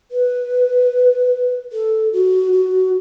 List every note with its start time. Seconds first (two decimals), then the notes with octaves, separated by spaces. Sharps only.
0.11 B4
1.72 A4
2.13 F#4
2.53 F#4